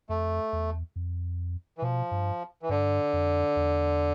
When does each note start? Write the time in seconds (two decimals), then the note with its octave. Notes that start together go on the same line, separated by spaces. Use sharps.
0.09 F2 A3
0.53 E2
0.96 F2
1.78 E3
1.82 B2 F3
2.11 G2
2.62 E3
2.69 G2 D3
3.13 F2
3.56 E2